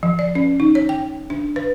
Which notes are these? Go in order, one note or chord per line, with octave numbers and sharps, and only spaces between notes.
F3
D5
C#4
D#4
C#5
G5
D4
B4